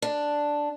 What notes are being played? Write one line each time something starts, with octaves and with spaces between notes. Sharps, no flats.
D4